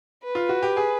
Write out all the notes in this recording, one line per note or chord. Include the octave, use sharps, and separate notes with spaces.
B4
F4
F#4
G4
G#4